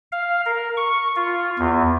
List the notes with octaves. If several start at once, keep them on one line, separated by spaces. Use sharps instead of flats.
F5
A#4
C#6
F4
E2